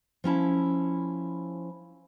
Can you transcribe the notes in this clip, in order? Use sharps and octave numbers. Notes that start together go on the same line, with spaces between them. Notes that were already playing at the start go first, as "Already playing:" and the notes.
F3 C#4 E4 A5